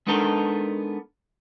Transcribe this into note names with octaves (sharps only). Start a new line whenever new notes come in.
G#3 B3 D4 D#4 A4 A#4